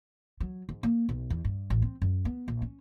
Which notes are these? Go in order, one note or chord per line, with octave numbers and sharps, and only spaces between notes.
F#3
G#2
A#3
B1
E2
G2
A1
C4
F#2
B3
A#1
C#4